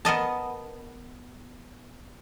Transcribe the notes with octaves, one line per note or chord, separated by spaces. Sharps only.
B3 A#4 D#5 A5